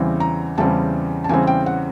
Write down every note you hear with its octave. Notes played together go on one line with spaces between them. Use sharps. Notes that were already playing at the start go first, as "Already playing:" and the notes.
Already playing: E2 C#3 E3 G3 C4
A#5
E2 C#3 E3 G3 C4 A5
A5
E2 C#3 E3 G3 C4 G#5
G5
F#5